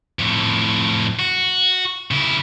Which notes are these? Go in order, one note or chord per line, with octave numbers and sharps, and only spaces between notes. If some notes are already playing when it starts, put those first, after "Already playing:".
F2 A2
F#4
C#3 E4